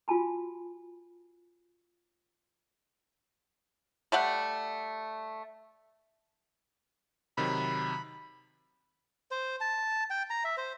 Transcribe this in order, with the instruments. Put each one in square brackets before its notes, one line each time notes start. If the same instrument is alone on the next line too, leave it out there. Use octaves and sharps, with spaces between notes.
[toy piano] F4 F#4 G#5 A5 B5
[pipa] G3 A3 F#5
[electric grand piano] C3 D#3 F#3 [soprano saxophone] B5
[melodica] C5
A5
G5
A#5
E5
C5